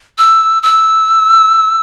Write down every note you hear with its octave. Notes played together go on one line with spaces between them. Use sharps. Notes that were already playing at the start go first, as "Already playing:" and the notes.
E6
E6